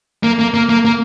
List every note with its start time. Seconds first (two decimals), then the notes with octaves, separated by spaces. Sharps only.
0.23 A#3
0.39 A#3
0.54 A#3
0.69 A#3
0.85 A#3